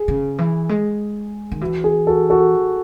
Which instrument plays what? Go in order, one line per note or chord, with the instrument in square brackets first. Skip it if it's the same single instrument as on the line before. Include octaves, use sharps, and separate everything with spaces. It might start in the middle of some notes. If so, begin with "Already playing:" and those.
Already playing: [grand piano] G#4
[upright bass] C#3
E3
G#3
D#3
[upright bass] E3 [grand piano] F#4
[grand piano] G#4
F#4 A4
F#4 A4